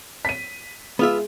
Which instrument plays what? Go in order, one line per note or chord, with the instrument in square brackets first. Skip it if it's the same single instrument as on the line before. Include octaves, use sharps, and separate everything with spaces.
[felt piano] B6 D#7
[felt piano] G#3 [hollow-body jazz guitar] B3 F4 E5